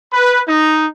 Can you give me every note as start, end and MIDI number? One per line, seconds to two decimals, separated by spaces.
0.11 0.40 71
0.47 0.85 63